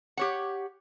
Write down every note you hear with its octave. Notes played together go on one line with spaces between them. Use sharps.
G4 C#5 F#5